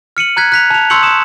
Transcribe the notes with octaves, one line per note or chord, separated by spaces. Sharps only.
F6 C#7 D#7 F#7
A#5 F#6 G#6 B6
F#6 B6 F7
A5 F7
C6 C#6 E6 G6 C#7 F#7
D#6 E7